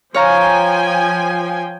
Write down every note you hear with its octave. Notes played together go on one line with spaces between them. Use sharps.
F3 C#5 F5 G5 G#5 A#5